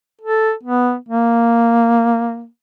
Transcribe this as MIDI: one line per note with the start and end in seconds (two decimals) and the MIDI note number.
0.21 0.52 69
0.63 0.96 59
1.09 2.46 58